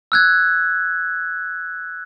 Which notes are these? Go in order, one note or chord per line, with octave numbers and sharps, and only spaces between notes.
E6 F#6 G#6